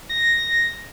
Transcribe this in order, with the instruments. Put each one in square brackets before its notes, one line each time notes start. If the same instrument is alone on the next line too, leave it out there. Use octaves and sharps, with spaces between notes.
[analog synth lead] A#6